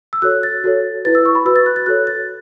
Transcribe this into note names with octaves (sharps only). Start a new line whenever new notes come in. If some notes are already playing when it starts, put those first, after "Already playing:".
E6
F#4 A4 C#5 F#6
A6
F#4 A4 C#5
E4 B4 A6
E6
C#6
B5
F#4 B4 E6
A6
F#6
A6
F#4 A4 C#5 F#6
A6